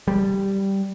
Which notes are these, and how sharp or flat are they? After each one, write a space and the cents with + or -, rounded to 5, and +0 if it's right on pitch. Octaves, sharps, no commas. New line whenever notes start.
G3 -5